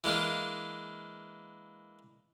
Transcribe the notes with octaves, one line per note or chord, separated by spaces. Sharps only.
E3 G#3 A#3 D4